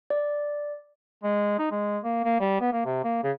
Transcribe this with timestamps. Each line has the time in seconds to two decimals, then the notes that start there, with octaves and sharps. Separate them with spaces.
0.10 D5
1.24 G#3
1.59 D#4
1.71 G#3
2.04 A#3
2.24 A#3
2.40 G3
2.61 B3
2.73 A#3
2.85 C3
3.04 A#3
3.23 C#3